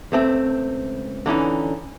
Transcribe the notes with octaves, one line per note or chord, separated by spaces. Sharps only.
C#2 A3 C4
D3 E3 C#4 D#4